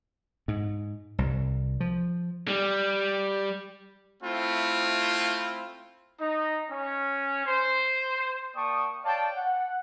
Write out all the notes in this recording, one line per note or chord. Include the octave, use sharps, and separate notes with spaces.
G#2
C2
F3
G3
A3 C4 E4 F4
D#4
C#4
C5
A#3 D5 G5 A5 C#6 D#6
C#5 D5 F5 G5 A5
F#5